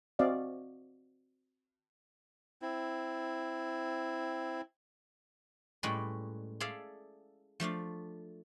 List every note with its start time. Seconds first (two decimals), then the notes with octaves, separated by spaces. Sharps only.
0.19 C4 F#4 D5 D#5 F5
2.62 C4 E4
5.83 A2 G3 G#3 C#4 B4 D5
6.60 G#4 A4 D5 E5 F5
7.60 F3 A3 D4 F5